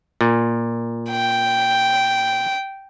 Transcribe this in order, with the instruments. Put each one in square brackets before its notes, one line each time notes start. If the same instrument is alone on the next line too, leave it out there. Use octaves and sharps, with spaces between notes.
[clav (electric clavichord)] A#2
[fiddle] G5